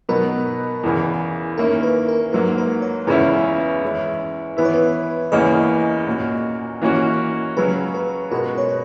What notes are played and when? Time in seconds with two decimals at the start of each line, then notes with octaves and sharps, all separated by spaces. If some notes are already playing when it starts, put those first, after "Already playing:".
0.09 B2 F#3 B3 D#4 A#4
0.83 E2 C#3 E3
1.57 D#3 A#3 C#4 E4 A#4
1.83 B4
2.09 A#4
2.33 G#2 F#3 A#3 B4
2.58 B4
2.82 C#5
3.07 E2 C#3 G#3 C#4 E4 B4
3.82 E3 G#3 C#4 E4
4.57 E3 B3 E4 B4
4.65 C#5
4.74 B4
5.32 E2 C#3 E3 A#3 C#4 D#5
6.07 A#2 A#3 C#4 F#4
6.82 E3 A#3 C#4 F#4
7.57 C#3 F#3 C#4 B4
7.94 B4
8.31 B2 G#3 B3 F#4 A#4
8.58 C#5
8.69 B4